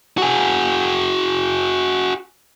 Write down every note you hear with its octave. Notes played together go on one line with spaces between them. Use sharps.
F#4 G#4